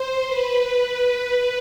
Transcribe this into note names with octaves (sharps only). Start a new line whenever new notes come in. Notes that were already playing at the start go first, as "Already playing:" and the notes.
Already playing: C5
B4